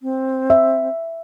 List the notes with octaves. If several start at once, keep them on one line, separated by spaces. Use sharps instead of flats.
C4
E5